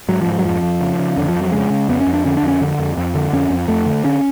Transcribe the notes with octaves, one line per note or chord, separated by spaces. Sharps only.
G#2 F#3
F3
G#2
F3
F#3
F2 F3
F2
C#3
C#3
F2 D3
F3
F2
F#3
C#3 G#3
C#3
F2 B3
C#4
F2
D4
D3 C#4
D4
F2
C#4
D3
F2
F2
D3
F2 C#4
F2
F2 A3
D3
D3 C#4